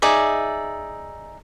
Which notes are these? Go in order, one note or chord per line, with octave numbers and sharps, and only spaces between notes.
D#4 G#4 D5 E5